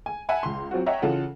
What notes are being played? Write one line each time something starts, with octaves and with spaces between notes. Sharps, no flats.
G#5
E5 F#5 G#5 A5 B5
C#2 C6
F#3 C4 F4 F#4
C#5 D#5 E5 F#5 G5 A#5
C#3 E3 F4 A4 F#5